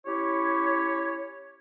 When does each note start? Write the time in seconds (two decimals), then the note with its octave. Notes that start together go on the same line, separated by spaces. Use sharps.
0.06 C#4 E4 G4 C#5